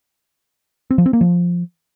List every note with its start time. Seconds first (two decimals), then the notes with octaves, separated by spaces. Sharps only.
0.91 C4
0.98 F3
1.06 C4
1.13 A#3
1.21 F3